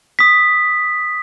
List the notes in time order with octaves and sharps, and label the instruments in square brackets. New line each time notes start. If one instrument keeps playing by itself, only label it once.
[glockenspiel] D#6 B6